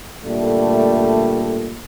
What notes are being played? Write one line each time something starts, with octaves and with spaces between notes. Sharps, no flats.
A#2 D3 G3 A3